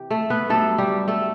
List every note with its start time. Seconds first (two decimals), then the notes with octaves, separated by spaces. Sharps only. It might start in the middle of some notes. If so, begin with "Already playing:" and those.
Already playing: C3 E3 G4
0.10 A3 A4
0.30 B3 B4
0.49 G2 F#3 A3 A4
0.78 G3 G4
1.08 A3 A4